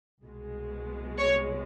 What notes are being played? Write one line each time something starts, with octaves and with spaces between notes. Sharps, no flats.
C2 B2 G#3
C#5